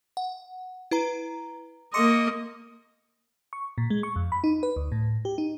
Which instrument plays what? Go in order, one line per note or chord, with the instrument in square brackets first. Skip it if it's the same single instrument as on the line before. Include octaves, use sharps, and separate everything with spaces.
[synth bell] F#5
E4 B4 A#5
[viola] A#3 D#5 [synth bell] C6 D6 C#7
[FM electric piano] C#6
A#2
G#3
C#6
F2
B5
D#4
B4
D2
A2
G4
D#4